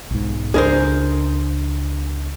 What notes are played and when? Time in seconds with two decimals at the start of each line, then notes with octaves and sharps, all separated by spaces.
0.11 B1 G#2
0.54 C#2 D4 G#4 A#4 C5